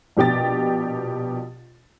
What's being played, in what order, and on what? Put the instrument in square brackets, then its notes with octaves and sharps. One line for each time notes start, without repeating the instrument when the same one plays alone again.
[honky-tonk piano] A#1 B2 G4 G5 A6